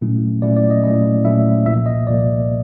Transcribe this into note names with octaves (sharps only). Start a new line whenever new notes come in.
A#2 F#3 A3 C#4 E4
A#2 F#3 A3 C#4 E4 D5
D5
D#5
A#2 F#3 A3 C#4 E4 D#5
A#2 F#3 A3 C#4 E4 E5
C2 A#2 F3 A#3 E5
D#5
C2 A#2 F3 A#3 D5